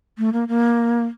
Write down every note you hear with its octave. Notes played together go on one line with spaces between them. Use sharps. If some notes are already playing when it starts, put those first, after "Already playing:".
A3
A#3
A#3